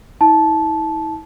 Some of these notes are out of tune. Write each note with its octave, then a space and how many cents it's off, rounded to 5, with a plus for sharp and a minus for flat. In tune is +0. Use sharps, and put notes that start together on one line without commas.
E4 -40 A5 -15